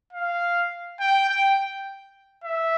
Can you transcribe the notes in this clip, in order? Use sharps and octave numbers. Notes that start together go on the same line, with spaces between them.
F5
G5
G5
E5